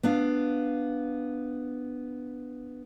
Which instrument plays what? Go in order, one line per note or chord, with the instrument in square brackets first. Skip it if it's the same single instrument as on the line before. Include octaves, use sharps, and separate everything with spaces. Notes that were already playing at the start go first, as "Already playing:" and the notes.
[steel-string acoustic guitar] B3 D4 F5